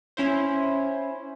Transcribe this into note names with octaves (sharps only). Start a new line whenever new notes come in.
C#4 E4 C5